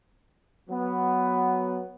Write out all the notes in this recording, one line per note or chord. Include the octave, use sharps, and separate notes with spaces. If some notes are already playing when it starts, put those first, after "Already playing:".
F#3 B3